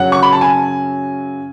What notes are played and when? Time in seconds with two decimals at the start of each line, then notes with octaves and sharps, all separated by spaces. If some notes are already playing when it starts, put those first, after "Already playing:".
Already playing: F#2 C#3 F#3 C#4 F#5
0.12 C#6
0.23 B5
0.32 A5
0.41 G#5